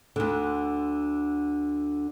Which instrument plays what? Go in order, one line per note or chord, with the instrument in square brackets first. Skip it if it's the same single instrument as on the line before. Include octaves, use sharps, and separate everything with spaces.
[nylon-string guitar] D2 D3